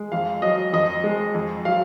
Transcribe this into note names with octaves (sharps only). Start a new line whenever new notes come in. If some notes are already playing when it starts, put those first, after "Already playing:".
Already playing: G#3
F2 F5
F#3 D#5
F2 D#5
G#3
F2
F#3 F5